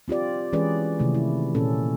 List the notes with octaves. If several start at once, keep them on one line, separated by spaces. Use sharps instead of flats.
C4 F4 G4 D5
E3 G#3 C#4 G#4 B4 D5
C3 D#3 A3 E4
E4
A#2 A#3 C#4 A4